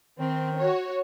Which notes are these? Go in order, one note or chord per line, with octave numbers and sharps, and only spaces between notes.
D#3 C4
F#4 C#5